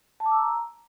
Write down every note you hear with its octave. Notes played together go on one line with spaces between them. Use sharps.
A5
D6
E6
A#5